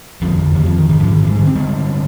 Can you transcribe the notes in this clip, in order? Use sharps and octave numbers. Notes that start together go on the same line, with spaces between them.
F2 D3 F3
D3
D#3
F3
D#3
G#2 D#3
F3
D#3
F3
G#3
D3
C4
G2 D3 G#3